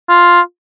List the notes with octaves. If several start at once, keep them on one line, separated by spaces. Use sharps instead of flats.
F4